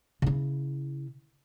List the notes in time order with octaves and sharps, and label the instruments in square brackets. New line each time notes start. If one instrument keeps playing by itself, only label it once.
[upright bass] C#3 E4